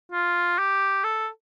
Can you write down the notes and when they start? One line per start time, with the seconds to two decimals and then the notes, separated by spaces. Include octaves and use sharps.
0.12 F4
0.58 G4
1.04 A4